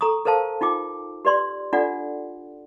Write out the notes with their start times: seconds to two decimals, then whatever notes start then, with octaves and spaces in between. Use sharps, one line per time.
0.01 A4 A#5 C#6 D#6
0.25 A4 A#4 C5 F5 A5
0.61 D#4 F4 G5 D6
1.25 G4 B4 D5 C6
1.73 D4 F4 A4 D5 F#5